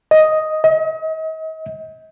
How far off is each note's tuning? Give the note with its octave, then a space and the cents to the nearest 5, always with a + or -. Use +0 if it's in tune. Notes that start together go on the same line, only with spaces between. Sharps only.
D#5 +5
D#5 +40